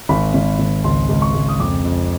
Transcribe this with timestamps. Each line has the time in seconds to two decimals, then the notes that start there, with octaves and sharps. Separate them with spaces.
0.09 G#1 B5
0.34 G#1
0.59 G#1
0.84 C#2 C6
1.09 C#2
1.22 C#6
1.34 C#2
1.48 D#6
1.60 F2 D6
1.85 F2